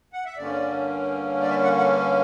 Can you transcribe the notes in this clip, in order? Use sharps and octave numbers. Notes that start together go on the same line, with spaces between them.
F#5
E5
G2 D3 A#3 C#4 D5
D5
E5
F#5
F#5